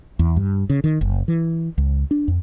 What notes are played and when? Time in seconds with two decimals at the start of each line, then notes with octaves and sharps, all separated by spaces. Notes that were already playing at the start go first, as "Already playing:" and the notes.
0.19 E2
0.36 G2
0.70 C#3
0.84 D#3
1.01 F#1
1.28 E3
1.78 C#2
2.11 D4
2.28 F2